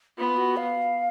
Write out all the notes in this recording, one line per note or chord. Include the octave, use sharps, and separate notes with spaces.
B3 F4
F#4
F5